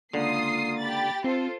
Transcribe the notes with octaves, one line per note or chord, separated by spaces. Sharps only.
C#2 D3 A#3 F4 D#6 C7
G4 B5 A6
C4 F4 A4 C5